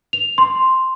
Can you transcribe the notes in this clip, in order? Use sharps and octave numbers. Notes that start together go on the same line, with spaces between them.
F7
C6